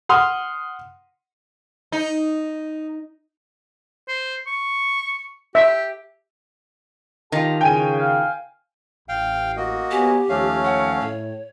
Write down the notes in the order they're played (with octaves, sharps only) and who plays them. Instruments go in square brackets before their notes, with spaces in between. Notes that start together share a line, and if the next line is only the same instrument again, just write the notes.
[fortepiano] F#5 C6 D#6 F6
[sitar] D#4
[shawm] C5
C#6
[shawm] G4 [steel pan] E5
[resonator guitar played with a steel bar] D#3 F4 [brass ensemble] G4 A5
[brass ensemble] C#3 [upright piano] G5 G#5 D#7
[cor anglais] F5
[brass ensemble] A1 [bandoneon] F5 G5
[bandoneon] A#3 F#4 D#5
[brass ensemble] B3 C#5 G#5 [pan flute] G4
[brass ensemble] D#2 F3 C#5 [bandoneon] A3 C#4 F5
[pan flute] F#5
[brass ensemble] A2 [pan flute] C#5